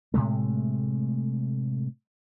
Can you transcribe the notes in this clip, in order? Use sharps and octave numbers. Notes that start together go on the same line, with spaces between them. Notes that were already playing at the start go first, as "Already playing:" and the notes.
A2 C3 G#3 A3